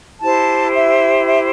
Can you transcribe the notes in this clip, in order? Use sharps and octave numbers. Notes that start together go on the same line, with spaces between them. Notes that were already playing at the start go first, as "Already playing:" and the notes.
E4 G4 C5 A5
E5
E5